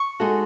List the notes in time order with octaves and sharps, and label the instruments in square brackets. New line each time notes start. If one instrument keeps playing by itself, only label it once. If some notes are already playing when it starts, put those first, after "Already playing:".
Already playing: [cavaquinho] C#6
[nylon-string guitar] G#3 D#4 F#4 A4